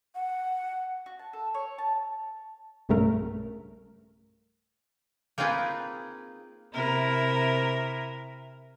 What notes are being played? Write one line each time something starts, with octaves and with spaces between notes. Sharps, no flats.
F#5
F#4
A5
A4
C#5
A5
B1 G2 C#3 A3 A#4
A#3 C4 D#4 F4 G#4 B4
C3 E4 A#4